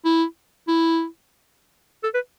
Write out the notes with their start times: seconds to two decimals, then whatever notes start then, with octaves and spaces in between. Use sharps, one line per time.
0.05 E4
0.68 E4
2.03 A4
2.14 B4